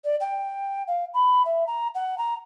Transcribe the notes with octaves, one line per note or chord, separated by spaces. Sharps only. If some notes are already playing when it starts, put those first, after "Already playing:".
D5
G5
F5
B5
E5
A#5
F#5
A#5